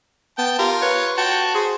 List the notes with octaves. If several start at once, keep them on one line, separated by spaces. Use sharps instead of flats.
B3 G5 A5
F4 G4 A#4
B4 C#5
F#4 G5 A5
G#4 C5